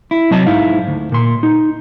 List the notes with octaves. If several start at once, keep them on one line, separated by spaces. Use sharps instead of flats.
E4
C3 F#3 D#5 A5
G#2 D#4 E4 F5
D2
A#2 C6
D#4